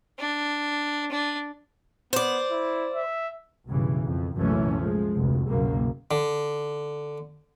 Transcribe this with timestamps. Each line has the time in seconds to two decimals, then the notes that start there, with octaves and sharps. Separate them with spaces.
0.19 D4
1.11 D4
2.13 B3 C5 D5
2.50 E4
2.94 E5
3.67 B1 G2 C#3 E3
4.04 F2
4.37 C2 F#2 A#2 E3 A3 C#4
4.80 F3 G#3
5.15 F1 D2
5.47 F#1 C2 F#2 B2 D#3 A#3
6.11 D3